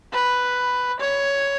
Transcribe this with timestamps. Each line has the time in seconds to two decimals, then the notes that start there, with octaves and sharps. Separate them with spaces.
0.13 B4
1.00 C#5